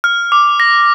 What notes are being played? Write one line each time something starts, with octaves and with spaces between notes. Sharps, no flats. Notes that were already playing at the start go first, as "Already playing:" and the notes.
F6
D6
A#6